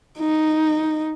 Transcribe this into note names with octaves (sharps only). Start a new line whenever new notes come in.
D#4